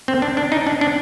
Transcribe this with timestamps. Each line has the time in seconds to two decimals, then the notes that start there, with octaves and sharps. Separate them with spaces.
0.08 C4
0.22 D4
0.37 D4
0.52 D#4
0.67 D4
0.81 D4